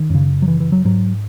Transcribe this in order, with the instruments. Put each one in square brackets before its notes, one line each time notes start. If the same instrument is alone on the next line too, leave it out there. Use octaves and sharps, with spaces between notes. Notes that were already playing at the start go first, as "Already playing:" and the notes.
Already playing: [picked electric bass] D#3
F#2 C#3
F#3
E3
E3
F#3
G#2 F#3